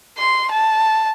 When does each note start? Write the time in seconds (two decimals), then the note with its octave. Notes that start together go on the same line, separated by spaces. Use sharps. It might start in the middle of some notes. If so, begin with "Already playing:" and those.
0.18 C6
0.51 A5